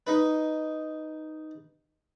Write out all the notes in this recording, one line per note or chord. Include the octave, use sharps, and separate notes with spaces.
D#4 B4